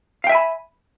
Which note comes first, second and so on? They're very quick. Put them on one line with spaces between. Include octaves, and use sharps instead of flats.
F5 G5 E5 G#5 B5